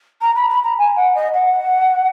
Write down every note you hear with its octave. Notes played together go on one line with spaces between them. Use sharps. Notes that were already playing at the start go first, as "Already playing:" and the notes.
A#5
B5
B5
A#5
G#5
F#5
D#5
F#5